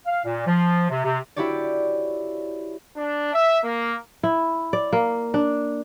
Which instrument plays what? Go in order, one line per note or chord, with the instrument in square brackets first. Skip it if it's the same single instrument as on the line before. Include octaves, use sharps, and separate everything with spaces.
[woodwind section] F5
A#2
F3
C3
C3
[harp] E4 F#4 G4 C#5 D5
[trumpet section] D4
E5
A#3
[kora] E4
D5
A#3
D4